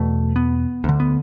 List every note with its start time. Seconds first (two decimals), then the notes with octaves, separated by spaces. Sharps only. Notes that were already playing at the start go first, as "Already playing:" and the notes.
Already playing: E2 B2 A3
0.36 B3
0.84 D2 D3
1.00 B3